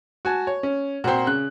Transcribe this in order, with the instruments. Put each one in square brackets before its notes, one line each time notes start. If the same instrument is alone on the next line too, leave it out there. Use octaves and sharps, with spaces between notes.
[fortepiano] F#4 G#5 A5
C#5
C#4
[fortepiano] A#2 C6 [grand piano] C4 F#4
[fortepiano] C#3 [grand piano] F#6